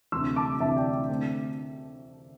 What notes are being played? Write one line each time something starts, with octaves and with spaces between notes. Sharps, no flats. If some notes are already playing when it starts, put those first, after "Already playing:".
D2 C3 E3 C6 E6
A5 D6
D2 C3 E3 E5 A5
D5 G5
D3 A3 C4